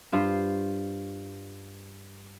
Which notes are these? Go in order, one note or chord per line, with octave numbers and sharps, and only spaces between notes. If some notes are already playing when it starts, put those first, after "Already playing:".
G2 F4 C5